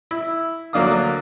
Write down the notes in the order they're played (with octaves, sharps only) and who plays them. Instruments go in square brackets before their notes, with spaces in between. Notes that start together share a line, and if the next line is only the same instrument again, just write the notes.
[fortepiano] E4
D2 F#3 A#3 D4 F5 D#6